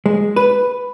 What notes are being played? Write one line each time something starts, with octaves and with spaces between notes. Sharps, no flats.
G#3
B4